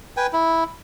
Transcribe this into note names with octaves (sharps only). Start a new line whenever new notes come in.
B4 G5 G#5
E4